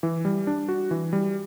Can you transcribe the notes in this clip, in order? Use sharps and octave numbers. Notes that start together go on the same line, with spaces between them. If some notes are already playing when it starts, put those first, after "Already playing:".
E3
G3
D4
F#4
E3
G3